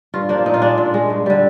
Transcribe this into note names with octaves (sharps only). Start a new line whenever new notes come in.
G2 F4
F3 A#3 D4
A#2 D#4
F4
G#3 D4
A#2
G#3
G2
D3 G3